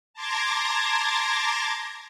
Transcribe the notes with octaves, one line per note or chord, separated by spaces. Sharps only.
A5 A#5 C6 D6 G#6 A#6